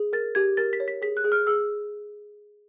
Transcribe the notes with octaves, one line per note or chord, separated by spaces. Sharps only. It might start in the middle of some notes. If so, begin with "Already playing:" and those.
Already playing: G#4
A#4 A6
G4 G#6
A#4 A6
B6
C#5
B6
G#4 B6
F#6
G#4
F6
G#4 E6